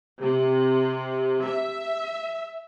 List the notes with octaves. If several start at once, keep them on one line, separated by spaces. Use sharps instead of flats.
C3
E5